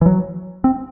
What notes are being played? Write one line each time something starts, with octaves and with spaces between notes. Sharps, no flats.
E3
F#3
C4